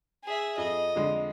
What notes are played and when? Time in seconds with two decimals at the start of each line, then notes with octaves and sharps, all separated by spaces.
0.24 G#4 E5
0.58 F2 D#5
0.96 F2 D3 G#3